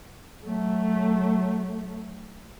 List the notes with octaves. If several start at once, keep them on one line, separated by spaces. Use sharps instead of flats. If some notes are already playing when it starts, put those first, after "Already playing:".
F#3 A3